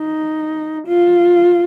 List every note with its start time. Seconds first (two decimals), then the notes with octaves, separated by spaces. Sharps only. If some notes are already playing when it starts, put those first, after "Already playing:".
Already playing: D#4
0.88 F4